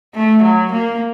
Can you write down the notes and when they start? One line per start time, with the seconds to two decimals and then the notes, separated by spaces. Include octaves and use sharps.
0.15 A3
0.43 F#3
0.72 A#3